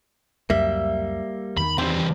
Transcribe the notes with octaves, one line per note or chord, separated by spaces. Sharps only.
C#2 F#2 G3 A#3 E5
E2 D#3 B5
E3 G3 C4